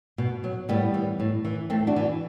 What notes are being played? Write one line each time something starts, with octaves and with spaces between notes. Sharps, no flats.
B2
F#3
A2 G3 B3
E3
A2
E3
A2 A3 C4
D4 F#4
E3